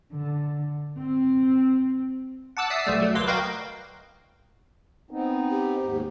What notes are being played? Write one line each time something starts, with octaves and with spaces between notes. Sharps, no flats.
D3
C4
F#5 A5 D6 E6 F#6
D5 E5 D#6 E6 C7
B1 G3 A3 D5 E6
F#3 A3
D2 A#3 B4 C6 D6
F#4 A#4 B4 D#5 F5 G5
B3 C4 D#4
G4
D#2 G#2